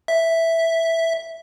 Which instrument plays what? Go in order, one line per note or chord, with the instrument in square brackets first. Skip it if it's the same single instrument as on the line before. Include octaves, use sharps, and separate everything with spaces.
[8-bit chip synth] E5